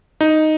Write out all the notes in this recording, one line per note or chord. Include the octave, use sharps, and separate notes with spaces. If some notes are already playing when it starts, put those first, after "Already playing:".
D#4